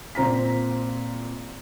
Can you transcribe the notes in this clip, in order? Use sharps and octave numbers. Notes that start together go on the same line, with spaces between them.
A#2 C4 A#5 B6